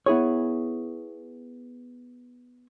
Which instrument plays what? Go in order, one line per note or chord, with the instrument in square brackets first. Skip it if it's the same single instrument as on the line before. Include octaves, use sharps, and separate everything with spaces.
[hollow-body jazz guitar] B3 E4 G#4 C#5